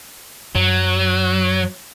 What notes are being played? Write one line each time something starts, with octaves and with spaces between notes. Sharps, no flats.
F#2 F#3